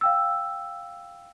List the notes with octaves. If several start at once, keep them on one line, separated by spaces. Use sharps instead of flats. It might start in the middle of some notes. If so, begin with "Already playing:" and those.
F5 G5 E6